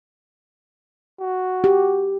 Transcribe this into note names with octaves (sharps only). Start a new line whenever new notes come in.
F#4
G4